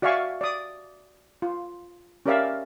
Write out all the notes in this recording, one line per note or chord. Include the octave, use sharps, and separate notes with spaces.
F#4 D5 E5 F5 G#5 C#6
D5 D#6
F4
C#4 G4 A#4 D5 E5 F5